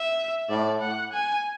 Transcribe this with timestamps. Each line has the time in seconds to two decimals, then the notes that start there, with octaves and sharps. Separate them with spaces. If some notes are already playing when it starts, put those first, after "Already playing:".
Already playing: E5
0.49 A2 D5
0.81 F#5
1.13 G#5